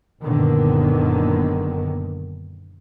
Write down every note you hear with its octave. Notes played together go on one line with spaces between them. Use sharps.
F#1 F#2 A#2 D3 D#3 B3